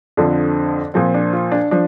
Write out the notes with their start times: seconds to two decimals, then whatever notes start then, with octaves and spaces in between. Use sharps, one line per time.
0.17 F2 D3 F3 D4
0.94 A#2 F3 C4
1.14 D4
1.33 F4
1.52 D4
1.71 F3 D4